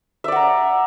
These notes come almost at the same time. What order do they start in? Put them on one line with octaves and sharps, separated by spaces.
E5 D5 F#5 A#5